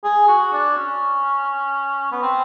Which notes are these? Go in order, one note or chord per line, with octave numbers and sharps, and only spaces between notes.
G#4
F#4
D4
C#4
B3
C4